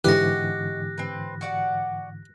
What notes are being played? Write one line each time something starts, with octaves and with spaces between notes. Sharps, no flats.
G#2 D3 E3 F#4 G4 D#5 F#6 A#6
C4 B4
F#4 D5 F#5